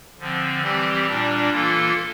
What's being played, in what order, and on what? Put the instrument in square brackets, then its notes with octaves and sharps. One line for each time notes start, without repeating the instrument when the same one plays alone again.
[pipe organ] D3 F3 C4
E3 G3 C4 G4
A#2 G3 D4
E3 A#3 F4 A4